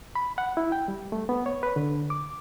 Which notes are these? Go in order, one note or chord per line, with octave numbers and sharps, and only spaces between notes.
B5
F#5
E4
G5
G3
A3
B3
C#5
B4
D3
D6